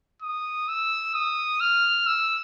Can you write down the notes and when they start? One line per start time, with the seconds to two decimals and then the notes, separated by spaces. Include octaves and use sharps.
0.22 D#6
0.68 E6
1.14 D#6
1.60 F6
2.07 E6